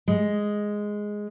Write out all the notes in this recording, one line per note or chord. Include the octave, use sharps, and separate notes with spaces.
G#3